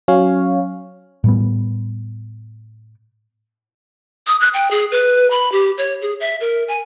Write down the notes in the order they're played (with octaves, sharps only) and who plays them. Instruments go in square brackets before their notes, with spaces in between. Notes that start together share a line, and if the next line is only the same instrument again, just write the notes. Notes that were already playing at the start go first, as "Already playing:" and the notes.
[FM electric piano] F#3 C#4 C#5 F5
[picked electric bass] A2 G3 B3
[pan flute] D#6
F#6
G5
G#4
B4
B5
G4
C#5
G#4
E5
A#4
G#5